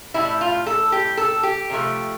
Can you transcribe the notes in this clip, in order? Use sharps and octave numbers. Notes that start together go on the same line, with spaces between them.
A2 G3 E4
F4
A4
G4
A4
G4
C3 F3 A3